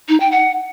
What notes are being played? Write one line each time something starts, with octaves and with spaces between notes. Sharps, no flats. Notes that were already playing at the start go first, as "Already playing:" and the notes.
D#4
G5
F#5